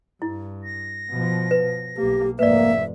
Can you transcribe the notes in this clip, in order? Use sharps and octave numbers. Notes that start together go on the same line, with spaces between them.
G2 E4
A#6
B2 F3
B4
B1 A#3 G4
F1 G#2 A#3 B4 D5 E5